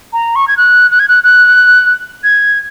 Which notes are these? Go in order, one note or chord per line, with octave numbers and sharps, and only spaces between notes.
A#5
C#6
G#6
F#6
F#6
G#6
F#6
F#6
G#6